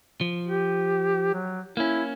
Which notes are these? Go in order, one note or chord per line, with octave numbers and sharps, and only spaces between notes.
F3
G4
F#3
A#3 C#4 E4